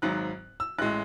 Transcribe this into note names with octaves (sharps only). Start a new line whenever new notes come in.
G#1 G#2 F#3 F#6
E6
A1 A2 G#3 F#6